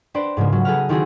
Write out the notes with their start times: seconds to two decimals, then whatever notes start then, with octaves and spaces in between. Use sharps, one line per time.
0.14 C4 D4 B4 C5 D5
0.37 G#2 C#3 F3 A#3
0.52 F#3
0.65 G#4 A4 B4 A#5 F6
0.89 D#3 C4 D#4 E4 F#4 G#4